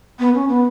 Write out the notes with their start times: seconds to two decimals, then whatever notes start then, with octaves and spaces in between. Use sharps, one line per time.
0.19 B3
0.35 C#4
0.49 B3